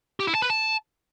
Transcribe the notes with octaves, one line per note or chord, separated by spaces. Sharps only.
G4
E4
A5
B4
A5